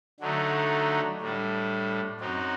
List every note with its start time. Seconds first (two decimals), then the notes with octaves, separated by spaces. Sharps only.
0.20 D3 F#3 A3 D#4
1.20 A2 G3 D4
2.20 F#2 F#3 C4 D#4